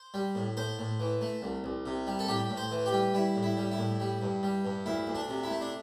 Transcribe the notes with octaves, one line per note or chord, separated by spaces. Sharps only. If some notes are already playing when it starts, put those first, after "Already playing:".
Already playing: C5
G3
A2
A2 C5
A2
E3
A3
C2
C2
C3
G3
A4
A2 G4
A2
C5
E3
G4
G3
G3 E4
A2
E4
G3
E4
A2
G3
G2
G3
G2
D2 E4
D2
D4
C3
E4
A3
D4